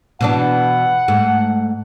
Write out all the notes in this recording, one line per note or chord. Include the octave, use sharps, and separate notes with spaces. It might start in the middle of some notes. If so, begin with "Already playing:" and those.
B2 E3 D4 F#5
G#2 A3